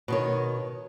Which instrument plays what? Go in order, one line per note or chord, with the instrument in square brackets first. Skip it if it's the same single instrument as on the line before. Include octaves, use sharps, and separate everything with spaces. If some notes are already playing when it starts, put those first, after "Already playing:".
[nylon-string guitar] B2 D#3 C#5